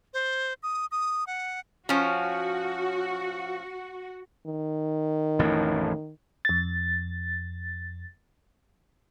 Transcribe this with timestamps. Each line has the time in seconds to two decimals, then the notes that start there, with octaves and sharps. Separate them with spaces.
0.14 C5
0.63 D#6
0.91 D#6
1.27 F#5
1.89 F3 C#4 F#4
4.46 D#3
5.39 A1 F2 A2
6.45 F2 A6